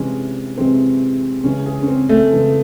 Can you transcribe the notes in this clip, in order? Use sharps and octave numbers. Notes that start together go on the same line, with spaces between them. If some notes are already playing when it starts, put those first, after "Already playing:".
Already playing: C3 E3 G#3 C#4
C3 E3 G#3 C4
C#3 E3 G#3 C#4
G#4
C#4
C4
A3
C#3 E3 G#3